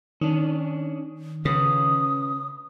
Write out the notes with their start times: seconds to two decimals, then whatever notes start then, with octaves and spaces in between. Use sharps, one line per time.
0.21 D#3 C#4 D4
1.45 C#3 C#4 B4 D#6